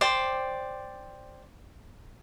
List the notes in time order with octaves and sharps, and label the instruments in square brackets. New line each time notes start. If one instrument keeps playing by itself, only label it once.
[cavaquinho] C5 D5 G5